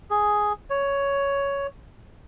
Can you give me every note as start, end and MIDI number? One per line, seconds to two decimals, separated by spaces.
0.11 0.53 68
0.70 1.67 73